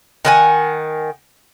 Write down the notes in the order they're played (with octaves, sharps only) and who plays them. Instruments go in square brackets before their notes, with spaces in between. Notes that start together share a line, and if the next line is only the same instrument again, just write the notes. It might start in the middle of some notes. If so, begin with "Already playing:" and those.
[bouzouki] D#3 F#5 G#5